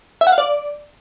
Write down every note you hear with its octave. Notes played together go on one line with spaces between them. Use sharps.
E5
F#5
F5
D5